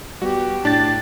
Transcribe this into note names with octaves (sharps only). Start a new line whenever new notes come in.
G3 B3 F#4 G4
A2 D4 G5 A5 A6